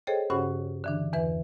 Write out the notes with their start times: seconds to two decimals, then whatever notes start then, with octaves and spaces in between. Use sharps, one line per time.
0.07 G#4 A4 C5 C#5 D#5 G5
0.30 G2 C#3 C#4 F#4 C5 F#5
0.84 D3 E3 D4
1.13 E2 E3 B4 E5